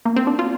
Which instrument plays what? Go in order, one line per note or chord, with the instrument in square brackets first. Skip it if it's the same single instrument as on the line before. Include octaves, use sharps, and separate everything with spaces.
[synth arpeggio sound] A#3
C4
D4
F4